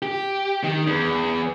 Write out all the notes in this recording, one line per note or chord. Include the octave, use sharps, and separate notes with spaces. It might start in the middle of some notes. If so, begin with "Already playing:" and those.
G4
D#3
E2